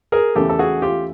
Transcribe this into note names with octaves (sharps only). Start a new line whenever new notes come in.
G#4 A#4
E2 C#3 E3 A3 G4 A4
A4
F#4 G#4
F4 G4